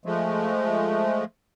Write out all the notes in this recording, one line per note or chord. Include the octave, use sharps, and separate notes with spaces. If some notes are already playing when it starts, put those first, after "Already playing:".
F3 G#3 A3